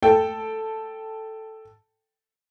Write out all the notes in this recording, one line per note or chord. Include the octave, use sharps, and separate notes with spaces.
A4 G5